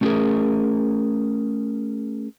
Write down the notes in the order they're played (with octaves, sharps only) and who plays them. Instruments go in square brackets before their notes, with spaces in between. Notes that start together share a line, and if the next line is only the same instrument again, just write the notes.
[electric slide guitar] A3 C#4 F4 G4 G#4 A#4